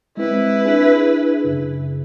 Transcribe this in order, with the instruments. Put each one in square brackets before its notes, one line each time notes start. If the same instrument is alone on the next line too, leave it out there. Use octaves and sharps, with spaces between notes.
[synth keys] G#3 C4 [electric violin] E4 B4
[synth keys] D4 G#4
F#2 C#3